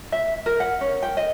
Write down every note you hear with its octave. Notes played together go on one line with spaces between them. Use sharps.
E5
A#4
F#5
C#4
G5
D#5